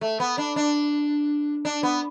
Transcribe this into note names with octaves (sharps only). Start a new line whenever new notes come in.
A3
B3
D4
D4
D4
B3